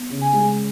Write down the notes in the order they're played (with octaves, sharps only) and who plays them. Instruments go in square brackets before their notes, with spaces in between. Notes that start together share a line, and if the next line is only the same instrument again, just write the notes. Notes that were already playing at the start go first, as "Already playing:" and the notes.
Already playing: [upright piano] B3
C#3
[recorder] G#5
[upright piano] G#3